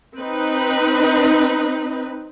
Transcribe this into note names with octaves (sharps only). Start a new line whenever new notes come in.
C4 D#4 B4